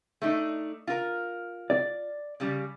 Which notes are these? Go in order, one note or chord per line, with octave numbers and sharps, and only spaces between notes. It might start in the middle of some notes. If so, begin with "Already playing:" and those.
A3 D4 D#4
F4 A#4
D5
C#3 G3